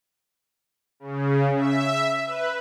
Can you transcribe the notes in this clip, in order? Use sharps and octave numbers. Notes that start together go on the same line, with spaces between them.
C#3
E5
B4